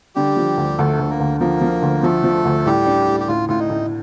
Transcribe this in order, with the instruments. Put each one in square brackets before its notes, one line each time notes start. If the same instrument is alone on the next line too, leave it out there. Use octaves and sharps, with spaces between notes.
[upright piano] D3 [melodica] G3 G4
[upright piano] F3
D2
[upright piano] D2 [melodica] A3 A4
[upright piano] D2
[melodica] A#3 A#4
[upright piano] D2
[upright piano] F3 [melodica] A#3 A#4
[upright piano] F3
D2
[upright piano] F3 [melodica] A3 A4
[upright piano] F3
D2
[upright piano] A2 [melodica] G3 G4
[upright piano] D4
A2
[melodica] G4
[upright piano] A2 [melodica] F4
[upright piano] A2 [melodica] F4
[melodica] D#4
[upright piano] A2